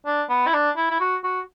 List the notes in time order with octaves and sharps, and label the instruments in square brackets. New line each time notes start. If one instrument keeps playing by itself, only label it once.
[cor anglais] D4
B3
E4
D4
E4
E4
F#4
F#4